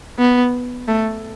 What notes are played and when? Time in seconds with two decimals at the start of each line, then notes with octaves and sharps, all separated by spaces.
0.19 B3
0.88 A3